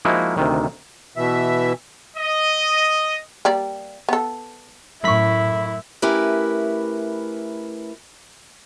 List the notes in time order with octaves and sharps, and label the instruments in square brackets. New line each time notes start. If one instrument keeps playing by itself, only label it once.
[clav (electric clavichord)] F3 G#3 A#3 D#4 E4 F#4
D2 C3 D#3
[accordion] B2 E3 E5
[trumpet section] D#5
[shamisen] G3 A#3 D5
B3 A4
[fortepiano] F#2 C#6 [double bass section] A2 [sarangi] E4 [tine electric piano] E5 B5 B6
[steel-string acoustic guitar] A3 C#4 E4 G4 A#4 B4